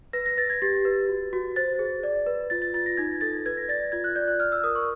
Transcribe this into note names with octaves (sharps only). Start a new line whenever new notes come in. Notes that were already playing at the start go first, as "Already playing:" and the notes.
B4 A#6
A#6
B4 A6
G#6
G4 A6
B4
F#4
F#4
C5 A6
G#4
D5
B4
F4 A6
A6
F4 A6
A#6
D#4 G#6
A4 A6
B4 G#6
A#6
D5 A6
F4 G#6
F#6
D5 G6
F#6
D5 F6
E6
A#4 D#6
C#6